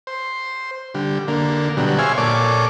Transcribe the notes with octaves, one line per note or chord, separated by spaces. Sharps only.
C5
D3 G3
D3 A#3
B2 D3 F#3 G3
G#4 C5 C#5 E5 F5 G#5
A#2 A4 C#5 D5 D6